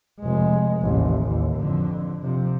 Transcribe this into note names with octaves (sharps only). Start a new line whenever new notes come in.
F1 G#3
A1 D#2
D#2
F2 D3
C3 F3